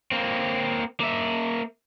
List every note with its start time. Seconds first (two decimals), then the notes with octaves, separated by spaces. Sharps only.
0.11 A#3 C4
1.00 A#3 E5